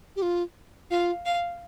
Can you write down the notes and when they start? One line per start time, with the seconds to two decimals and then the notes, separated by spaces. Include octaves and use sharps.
0.16 G4
0.22 F4
0.90 F4 F5
1.25 F5